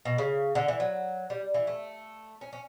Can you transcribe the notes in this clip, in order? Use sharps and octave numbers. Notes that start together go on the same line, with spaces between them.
B2
C#3
D3
E3
F#3
G3
E3
A3
C#4
C#4